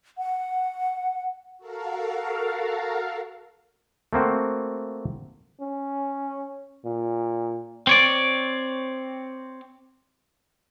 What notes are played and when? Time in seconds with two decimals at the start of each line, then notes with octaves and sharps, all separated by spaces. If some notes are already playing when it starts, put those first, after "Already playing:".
0.18 F#5
1.58 F#4 A4 A#4 F5
4.13 A3 A#3 C4 F#4
5.60 C#4
6.85 A#2
7.87 C4 C#5 D5